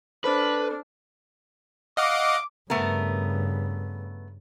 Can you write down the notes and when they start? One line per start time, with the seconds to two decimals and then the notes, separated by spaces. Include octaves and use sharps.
0.24 D4 A4 B4 C5 F6
1.97 D#5 F5 F#5 D6
2.70 G2 C#3 A3 B3 A#4